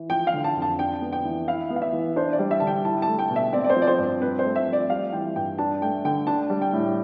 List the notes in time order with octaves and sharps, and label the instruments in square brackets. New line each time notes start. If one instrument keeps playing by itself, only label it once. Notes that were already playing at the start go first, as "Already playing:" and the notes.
Already playing: [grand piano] E3
[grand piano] F3 [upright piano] G5
[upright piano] F5
[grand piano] D3
[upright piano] A5
[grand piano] F2
[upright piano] A5
[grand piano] D4 [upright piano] G5
[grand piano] B3
[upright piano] G5
[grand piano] E3
[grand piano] E4 [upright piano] F5
[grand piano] B3
[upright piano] F5
E5
[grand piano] E3
[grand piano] D4 [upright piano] C5
[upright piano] D5
[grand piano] G3
[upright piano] E5
[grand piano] D3 [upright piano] A5
[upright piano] G5
[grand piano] E4 [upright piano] A5
[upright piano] A5
[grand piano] A3
[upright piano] G5
[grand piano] B2
[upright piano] E5
[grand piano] C4 [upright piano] D5
[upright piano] D5
C5
[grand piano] F3
[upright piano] D5
C5
[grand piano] G2
[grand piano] C4 [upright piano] B4
[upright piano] C5
[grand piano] A3
[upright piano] E5
[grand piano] F3
[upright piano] D5
[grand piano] G3 [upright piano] F5
[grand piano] E3 [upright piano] G5
[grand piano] G2 [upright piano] G5
[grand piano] D4 [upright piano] A5
[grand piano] A3 [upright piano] G5
[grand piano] D3 [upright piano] G5
[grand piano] D4 [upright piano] A5
[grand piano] G3
[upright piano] G5
[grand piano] A2